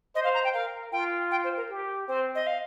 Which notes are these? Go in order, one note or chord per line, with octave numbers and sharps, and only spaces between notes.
C5 D#5
F5
A#5
G5
A#4 F5
F4 G5
G5
C5
A#4
G4
C4 C5
D#5
F5